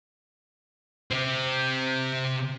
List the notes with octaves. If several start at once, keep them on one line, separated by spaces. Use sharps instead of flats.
C3 C4